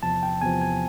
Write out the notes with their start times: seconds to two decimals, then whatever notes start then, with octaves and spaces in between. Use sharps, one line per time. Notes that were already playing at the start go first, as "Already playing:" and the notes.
0.03 E2 C3 F3 A5
0.23 G5
0.41 E2 C3 F3 G#5
0.61 G#5